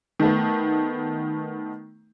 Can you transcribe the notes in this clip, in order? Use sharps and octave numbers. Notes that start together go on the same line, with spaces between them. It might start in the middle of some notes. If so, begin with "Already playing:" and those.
D#3 A3 B3